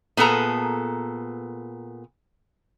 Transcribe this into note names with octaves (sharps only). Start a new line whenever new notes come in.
A#2 B3 G#4 A4 A#5